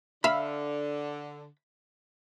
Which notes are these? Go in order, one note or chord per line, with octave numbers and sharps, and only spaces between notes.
D3 E5 F5 B5